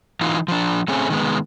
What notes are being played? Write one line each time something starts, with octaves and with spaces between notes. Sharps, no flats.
E3 D#4 F4
F3 D4
A3 C4 C#4 G#4
D#3 G#3 B3